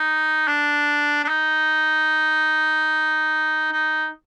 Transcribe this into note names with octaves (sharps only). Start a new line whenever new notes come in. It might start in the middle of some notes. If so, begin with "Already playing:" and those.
Already playing: D#4
D4
D4
D#4
D#4